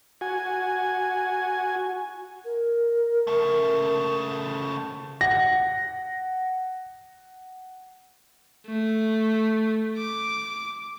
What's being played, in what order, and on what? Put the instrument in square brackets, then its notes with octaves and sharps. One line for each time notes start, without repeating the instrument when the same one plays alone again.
[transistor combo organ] F#4 G#5
[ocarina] A#4
[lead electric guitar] C#3 A3
[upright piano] F#5 [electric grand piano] A#6
[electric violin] A3
D6